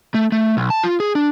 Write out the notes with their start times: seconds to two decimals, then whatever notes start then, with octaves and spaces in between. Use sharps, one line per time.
0.15 A3
0.32 A3
0.57 B1
0.70 A5
0.83 F4
1.00 G#4
1.15 D4